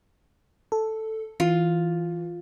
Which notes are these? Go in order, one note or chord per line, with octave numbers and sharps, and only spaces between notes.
A4
E3 F4